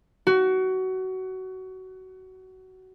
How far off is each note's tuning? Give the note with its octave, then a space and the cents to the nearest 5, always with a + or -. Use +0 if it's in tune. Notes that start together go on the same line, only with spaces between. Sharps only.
F#4 +20